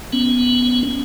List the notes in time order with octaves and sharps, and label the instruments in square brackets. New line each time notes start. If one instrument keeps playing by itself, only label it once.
[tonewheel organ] B3 C#4